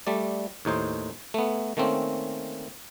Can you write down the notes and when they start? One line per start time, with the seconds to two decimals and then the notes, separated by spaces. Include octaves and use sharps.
0.07 G3 A3 D5
0.65 D#2 A2 D#4 C5
1.34 A3 B3
1.77 D#3 A3 A#3 C4 C#4